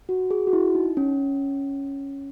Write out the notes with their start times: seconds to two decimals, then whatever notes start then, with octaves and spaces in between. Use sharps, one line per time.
0.09 F#4
0.31 G#4
0.47 F#4
0.53 E4
0.75 D#4
0.97 C#4